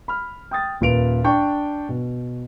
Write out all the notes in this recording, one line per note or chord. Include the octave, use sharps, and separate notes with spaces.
B5 F6
G5 D#6 A6
D#1 A#2 B4 D7 F7
D4 G5 C#6
B2